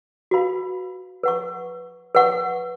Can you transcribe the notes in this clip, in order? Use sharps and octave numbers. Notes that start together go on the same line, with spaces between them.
F#4 B4 F5 B5
B4 F#5 C#6
B4 F#5 C#6